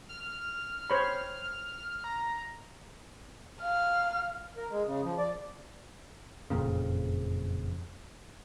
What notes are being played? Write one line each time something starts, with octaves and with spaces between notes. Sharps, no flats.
F6
C5 C#5 B5
A#5
F5 F6
A#4
G#3
C#3
F3
D5
F#1 F2 A#2 C#3